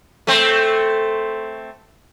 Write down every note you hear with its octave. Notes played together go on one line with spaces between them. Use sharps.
A3 C4